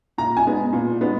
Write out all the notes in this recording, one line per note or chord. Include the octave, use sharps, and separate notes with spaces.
A#2 A#5
G#5
G#3 B3
A#2
G#3 B3